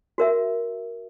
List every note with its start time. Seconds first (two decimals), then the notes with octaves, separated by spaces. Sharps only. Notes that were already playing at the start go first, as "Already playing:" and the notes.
0.18 F#4 A#4 E5